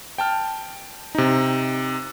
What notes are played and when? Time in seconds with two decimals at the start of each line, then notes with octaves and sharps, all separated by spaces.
0.18 G5 A5 F6
1.15 C3 D#4